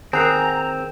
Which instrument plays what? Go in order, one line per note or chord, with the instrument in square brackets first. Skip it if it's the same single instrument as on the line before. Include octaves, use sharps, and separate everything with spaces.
[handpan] D#3 A#4 [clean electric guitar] C4 [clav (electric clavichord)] G#4 F#5 [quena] A#5